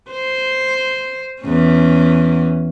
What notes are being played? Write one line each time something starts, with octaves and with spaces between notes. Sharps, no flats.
C5
E2 C#4